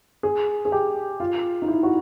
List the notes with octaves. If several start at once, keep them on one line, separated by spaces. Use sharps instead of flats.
G#4
G#4
G4
F4
D#4
E4
F#4